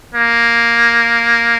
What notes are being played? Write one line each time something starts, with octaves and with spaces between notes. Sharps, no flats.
A#3